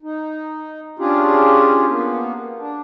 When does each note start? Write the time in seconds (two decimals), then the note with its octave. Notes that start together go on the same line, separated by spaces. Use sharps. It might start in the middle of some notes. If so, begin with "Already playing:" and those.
0.03 D#4
0.99 C#4 D4 F4 G4 G#4
1.89 A#3 B3
2.59 D4